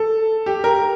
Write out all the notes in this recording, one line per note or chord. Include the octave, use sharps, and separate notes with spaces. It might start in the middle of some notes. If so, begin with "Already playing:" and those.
Already playing: A4
G4
A#4